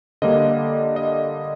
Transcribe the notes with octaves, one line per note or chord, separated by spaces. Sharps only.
D3 G3 A#3 D#5
D#5